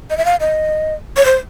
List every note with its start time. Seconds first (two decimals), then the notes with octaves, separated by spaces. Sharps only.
0.10 D#5
0.17 E5
0.25 F5
0.40 D#5
1.17 C#5
1.25 C5